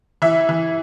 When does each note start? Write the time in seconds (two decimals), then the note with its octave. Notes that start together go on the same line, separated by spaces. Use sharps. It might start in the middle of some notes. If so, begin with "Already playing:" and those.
0.22 E3 E4 E5
0.49 E3